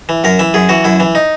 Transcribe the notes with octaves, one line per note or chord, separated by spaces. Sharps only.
E3
F#2 A#4
E3 E5
F#2 G#4
E3 F#4
F#2 E4
E3
D#4